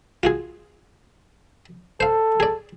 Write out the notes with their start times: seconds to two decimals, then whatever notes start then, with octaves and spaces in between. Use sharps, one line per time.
0.23 F4 F#4 G#4
2.00 A4 C5 F5
2.40 G#4 D5